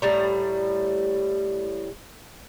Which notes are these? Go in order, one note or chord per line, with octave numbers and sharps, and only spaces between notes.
A2 G3 A#5